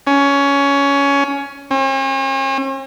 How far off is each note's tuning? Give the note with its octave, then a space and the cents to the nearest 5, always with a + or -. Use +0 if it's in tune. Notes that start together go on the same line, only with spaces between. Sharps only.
C#4 +15
C#4 -45